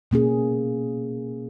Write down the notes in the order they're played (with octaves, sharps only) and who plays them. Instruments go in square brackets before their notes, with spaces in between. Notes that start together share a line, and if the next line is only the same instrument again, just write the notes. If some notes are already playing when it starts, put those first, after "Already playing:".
[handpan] B2 A#3 C#4 G#4